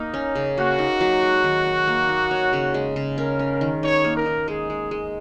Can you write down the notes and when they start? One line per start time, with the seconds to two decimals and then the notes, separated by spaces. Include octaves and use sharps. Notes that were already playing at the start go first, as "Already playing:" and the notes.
Already playing: A#3 D#4
0.14 C#4
0.35 C#3
0.57 A#3 F#4
0.79 D#4
1.01 F#3
1.22 G#3
1.44 D#3
1.65 D#4
1.87 A#3
2.09 D#4
2.31 C#5
2.53 C#3
2.74 G#3
2.96 C#3
3.18 C#4 A#4
3.39 C#4
3.61 D#3
3.83 D#4 C#5
4.04 A#3
4.15 A#4
4.26 D#4
4.48 G#3 G#4
4.70 G#3
4.91 G#3